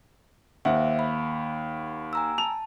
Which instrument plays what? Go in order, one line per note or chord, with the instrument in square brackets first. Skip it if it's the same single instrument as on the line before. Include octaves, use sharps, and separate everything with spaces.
[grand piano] D#2 F#5 [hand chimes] C5 E5
[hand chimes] B5
G#5 A#5 E6
[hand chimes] A5 [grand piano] F7